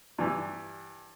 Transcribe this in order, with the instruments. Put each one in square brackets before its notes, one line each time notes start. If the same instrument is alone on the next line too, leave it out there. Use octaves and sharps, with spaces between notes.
[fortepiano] G2 E3